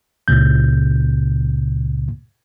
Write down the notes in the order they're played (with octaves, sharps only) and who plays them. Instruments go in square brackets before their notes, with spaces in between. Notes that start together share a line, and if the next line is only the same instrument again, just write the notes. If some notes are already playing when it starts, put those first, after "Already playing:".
[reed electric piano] C#2 A#2 C#3 G6